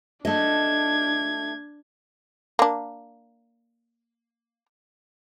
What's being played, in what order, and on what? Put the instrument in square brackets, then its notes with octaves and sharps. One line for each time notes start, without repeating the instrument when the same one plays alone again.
[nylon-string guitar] A3 D#5 [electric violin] D4 G#6
[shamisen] A#3 D4